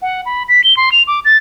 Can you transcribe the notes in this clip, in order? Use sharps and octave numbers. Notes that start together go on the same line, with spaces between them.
F#5
B5
B6
G7
C6
F7
D6
A6